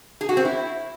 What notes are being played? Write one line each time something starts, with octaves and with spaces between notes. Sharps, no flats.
G#4
F#4
C4
E4